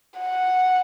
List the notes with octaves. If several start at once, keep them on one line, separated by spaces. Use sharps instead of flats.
F#5